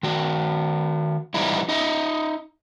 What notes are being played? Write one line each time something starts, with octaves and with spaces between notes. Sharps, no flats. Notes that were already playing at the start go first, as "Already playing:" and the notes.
D#3 F#4
E3 G3 D#4 E4
D#4 D#5 E5